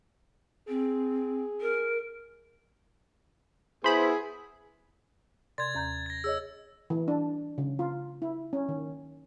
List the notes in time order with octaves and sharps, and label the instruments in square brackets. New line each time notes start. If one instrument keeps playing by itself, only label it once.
[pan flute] C4 [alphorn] G#4
[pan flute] A#4
[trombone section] B3 E4 [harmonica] G#4 [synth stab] C5 B5
[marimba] C3 D5 C6 [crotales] G#6 A6
[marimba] D#2 A#5 G6
[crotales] A6 A#6
[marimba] G#4 C#5 D#5 [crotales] E6
[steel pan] E3
D4
C#3
F4
E4
C#4
D#3